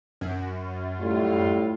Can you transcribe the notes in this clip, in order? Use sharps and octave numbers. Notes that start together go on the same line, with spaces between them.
F#2
A2 G3 F4